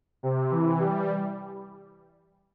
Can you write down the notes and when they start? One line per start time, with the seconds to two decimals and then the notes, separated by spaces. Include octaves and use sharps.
0.23 C3
0.51 E3
0.80 G3